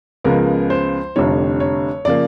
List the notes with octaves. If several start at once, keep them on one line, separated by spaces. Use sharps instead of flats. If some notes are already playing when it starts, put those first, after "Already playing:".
C#2 C#3 F3 G#3 B3 A#4
C5
F1 F2 D3 G3 C#5
C#5
C#3 F3 A#3 D5